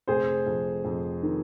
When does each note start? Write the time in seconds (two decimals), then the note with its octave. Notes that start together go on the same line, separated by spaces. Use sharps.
0.08 F1 G#4 C5
0.46 F2
0.85 F2
1.23 D#3